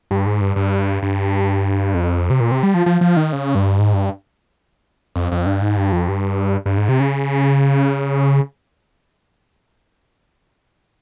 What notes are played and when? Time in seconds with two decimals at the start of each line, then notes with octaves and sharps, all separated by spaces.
0.11 G2
0.26 G#2
0.41 G2
0.56 G2
1.02 G2
1.94 F2
2.30 C3
2.40 A#2
2.51 C3
2.63 G3
2.74 F3
2.86 F3
3.01 F3
3.17 D#3
3.33 C#3
3.55 G2
3.79 G#2
3.93 G2
5.16 F2
5.32 F2
5.46 G2
5.62 G#2
5.77 G2
5.92 F2
6.08 G2
6.66 G2
6.77 G#2
6.89 C3
7.00 C#3